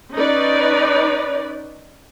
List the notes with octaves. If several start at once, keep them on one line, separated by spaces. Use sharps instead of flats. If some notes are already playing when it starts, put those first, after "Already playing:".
C#4 D#4 B4 D5